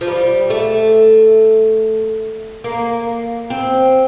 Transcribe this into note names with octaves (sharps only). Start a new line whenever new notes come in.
F3
G3
A3
A#3
C4